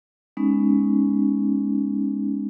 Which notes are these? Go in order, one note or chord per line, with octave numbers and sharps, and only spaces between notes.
G#3 B3 C#4 D#4